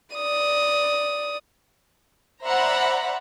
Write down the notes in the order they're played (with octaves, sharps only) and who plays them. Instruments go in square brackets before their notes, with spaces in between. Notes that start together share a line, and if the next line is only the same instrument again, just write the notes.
[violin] D5 D#6
[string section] C5 D5 E5 F#5 A#5 B5